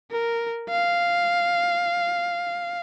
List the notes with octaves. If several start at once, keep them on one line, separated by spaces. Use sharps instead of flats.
A#4
F5